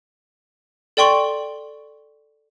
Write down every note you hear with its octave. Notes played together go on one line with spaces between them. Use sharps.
A4 D5 G5 C6 C#6 F#7